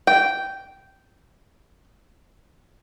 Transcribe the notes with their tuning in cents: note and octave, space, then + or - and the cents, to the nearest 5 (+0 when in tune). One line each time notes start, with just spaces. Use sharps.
G5 -10